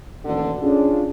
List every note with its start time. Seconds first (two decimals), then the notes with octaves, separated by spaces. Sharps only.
0.24 A1 D#2 B2 D3
0.61 C#4 D4 F4 G#4